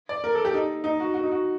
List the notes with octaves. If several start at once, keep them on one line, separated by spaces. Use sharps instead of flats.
D5
A#4
A4
G4
D#4
D#4
F#4
F#4
D#4
F#4